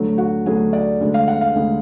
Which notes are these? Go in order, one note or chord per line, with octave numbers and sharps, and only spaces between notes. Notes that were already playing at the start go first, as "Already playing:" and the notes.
Already playing: D2 D3 F#3 A3
F#4
D2 D3 F#3 A3 G#4
D5
D2 D3 G#3
F5
F#5
F5
D2 D3 G#3